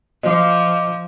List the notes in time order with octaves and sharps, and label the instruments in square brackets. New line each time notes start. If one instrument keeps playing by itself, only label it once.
[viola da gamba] F3 [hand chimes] D#5 D6